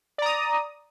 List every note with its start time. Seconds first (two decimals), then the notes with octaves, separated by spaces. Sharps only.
0.18 D5
0.22 A#5
0.26 D#6